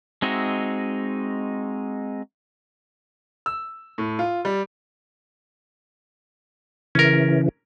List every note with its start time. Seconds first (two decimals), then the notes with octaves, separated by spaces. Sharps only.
0.22 G#3 C4 D#4 F#4 E5
3.46 E6
3.98 A2
4.19 F4
4.45 G3
6.95 C#3 E3 C#4 A#4